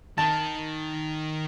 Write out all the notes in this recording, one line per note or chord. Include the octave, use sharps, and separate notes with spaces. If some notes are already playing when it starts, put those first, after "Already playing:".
D#3 A5